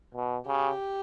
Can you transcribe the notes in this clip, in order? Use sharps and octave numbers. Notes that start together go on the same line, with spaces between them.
B2
C#3 G4